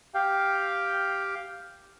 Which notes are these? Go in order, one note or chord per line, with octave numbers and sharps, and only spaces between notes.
G4 F5 G5